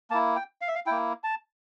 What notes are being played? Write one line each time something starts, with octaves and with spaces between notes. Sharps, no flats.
A#3 E4 A5
G5
F5
E5
F5
A#3 E4 G5
A5